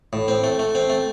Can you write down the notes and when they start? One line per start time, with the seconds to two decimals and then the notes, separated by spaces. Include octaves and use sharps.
0.13 A2
0.28 C4
0.44 A3
0.59 A3
0.75 C4
0.90 A3